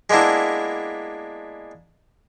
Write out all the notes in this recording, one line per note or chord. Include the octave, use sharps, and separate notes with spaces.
G#3 A#3 B3 D4 E4